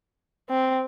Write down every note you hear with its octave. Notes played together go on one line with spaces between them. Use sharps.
C4